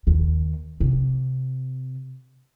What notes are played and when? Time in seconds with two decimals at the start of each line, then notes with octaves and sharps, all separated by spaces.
0.07 D#2
0.80 C3